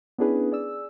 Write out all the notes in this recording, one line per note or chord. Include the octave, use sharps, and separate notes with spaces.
B3 C#4 D4 E4 G#4 B4
G#4 D5 E6